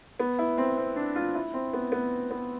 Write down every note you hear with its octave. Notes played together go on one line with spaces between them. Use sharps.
B3
E4
C4
C4
D4
F4
E4
C4
B3
B3
B3